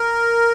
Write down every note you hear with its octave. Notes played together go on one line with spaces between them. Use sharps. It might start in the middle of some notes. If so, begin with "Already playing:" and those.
Already playing: A#4